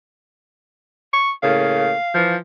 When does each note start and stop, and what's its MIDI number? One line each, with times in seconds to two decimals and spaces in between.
1.13 1.31 85
1.43 1.93 45
1.43 1.93 49
1.43 1.93 58
1.43 2.29 77
2.14 2.37 52
2.14 2.37 53